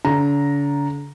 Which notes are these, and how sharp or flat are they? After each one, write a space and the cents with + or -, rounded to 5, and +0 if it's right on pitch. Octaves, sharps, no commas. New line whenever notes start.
D3 -45 A#5 +0